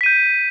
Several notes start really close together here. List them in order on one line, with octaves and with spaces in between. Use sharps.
B6 D#7 G6